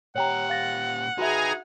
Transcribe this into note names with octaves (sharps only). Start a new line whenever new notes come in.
A#2 G4 C#5 F#5 G5 A#5
F5 A6 A#6
D#4 F#4 G#4 B4 E5 G#5 A#5